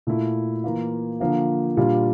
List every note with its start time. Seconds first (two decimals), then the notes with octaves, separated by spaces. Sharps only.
0.07 A#2 A3 E4
0.64 E3 A#3 F4
1.20 D3 F3 A#3 F4
1.77 A#2 G3 D4 F4